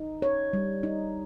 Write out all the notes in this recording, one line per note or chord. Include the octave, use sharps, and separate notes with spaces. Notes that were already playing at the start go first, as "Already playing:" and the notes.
Already playing: D#4
C#5
G3
D#4